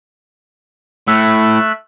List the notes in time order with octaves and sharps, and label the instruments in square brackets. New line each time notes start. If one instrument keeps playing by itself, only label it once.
[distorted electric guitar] A2 [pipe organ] A3 E5 F#6 [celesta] E6